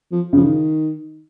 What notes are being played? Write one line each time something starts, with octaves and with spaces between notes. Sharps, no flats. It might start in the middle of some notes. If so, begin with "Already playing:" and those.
F3
C#3
F3
D#3